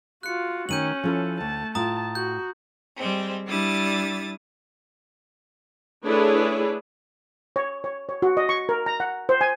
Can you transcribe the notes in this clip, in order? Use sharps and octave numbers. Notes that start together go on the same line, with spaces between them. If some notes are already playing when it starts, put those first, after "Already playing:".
F4 F#4 F#6 C#7
D#3 A3 C#4 G6 D#7 F#7
F3 C#4 E4 A4
D2 A3 A5
A2 F4 A5 A#5 D#6
F#4 G6
G3 G#3 C4
G3 D4 E4 D#6 A6
A3 D4 E4 G#4 B4 C#5
C#5
C#5
C#5
F#4
D#5
C#6
A#4
A#5
F#5
C5
G#5